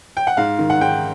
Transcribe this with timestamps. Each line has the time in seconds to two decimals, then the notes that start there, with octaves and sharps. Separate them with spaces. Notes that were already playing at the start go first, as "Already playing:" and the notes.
0.17 G5
0.27 F#5
0.37 G#2 F5
0.59 D#3
0.70 F#5
0.81 G#2 G5